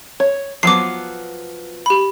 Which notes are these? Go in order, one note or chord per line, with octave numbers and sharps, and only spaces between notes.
C#5
F3 F#3 B3 D6 C7
G4 B5